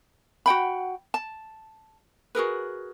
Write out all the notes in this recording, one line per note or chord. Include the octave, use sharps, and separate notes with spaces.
F#4 F#5 G5 B5
A5
F#4 G#4 A#4 B4